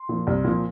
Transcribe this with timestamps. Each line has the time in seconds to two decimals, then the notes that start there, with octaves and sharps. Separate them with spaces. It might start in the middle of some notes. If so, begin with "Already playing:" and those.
Already playing: C6
0.09 A#2 F3
0.27 C2
0.44 A#2 F3